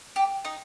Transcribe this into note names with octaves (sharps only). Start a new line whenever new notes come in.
G4
D#4